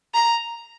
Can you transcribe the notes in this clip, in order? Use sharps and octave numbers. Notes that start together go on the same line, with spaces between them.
A#5